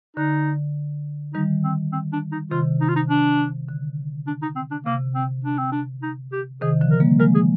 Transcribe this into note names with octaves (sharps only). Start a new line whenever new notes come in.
D3 D#4
D#3 G3 D#4
C4
C4
D4
D#4
C3 D#3 F4
D#4
F4
D#4
D4
D3
D4
D#4
C4
D4
C3 A#3
C4
D4
C4
D4
D#4
G4
C3 D#3 G#4
D3 F3
A#4
G3 A#3
F3 G#3 A#4
G#4